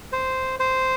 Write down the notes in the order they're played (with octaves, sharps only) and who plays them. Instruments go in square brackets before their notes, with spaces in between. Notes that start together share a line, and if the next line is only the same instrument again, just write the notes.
[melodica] C5
C5